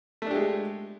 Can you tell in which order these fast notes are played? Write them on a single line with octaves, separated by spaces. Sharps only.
A3 D4 G4 G#3